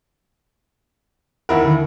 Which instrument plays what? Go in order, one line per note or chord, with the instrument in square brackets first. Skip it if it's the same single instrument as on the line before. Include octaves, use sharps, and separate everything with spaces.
[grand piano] D#2 E4 A#4 [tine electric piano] F#5 B5
[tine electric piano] D3 D#3